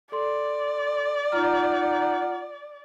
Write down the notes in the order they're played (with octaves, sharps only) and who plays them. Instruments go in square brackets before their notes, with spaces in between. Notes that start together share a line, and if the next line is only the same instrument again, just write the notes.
[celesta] A4 C6 [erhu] D5
[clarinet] D#4 [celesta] F4 A#5 F6 [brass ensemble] F#5